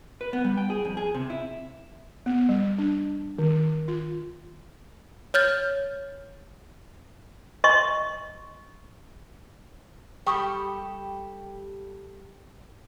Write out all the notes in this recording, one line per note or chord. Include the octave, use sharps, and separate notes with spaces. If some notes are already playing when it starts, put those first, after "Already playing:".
B4
B3
G3
G5
G#4
F2
G#4
C3
E4
B3
G3
D4
D#3
F4
C#5 F6 G6 A6
D#5 C6 C#6
G3 G4 A4 G5 C#6 D#6